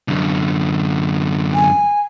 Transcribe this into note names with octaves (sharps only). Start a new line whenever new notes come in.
F#2 D3
G#5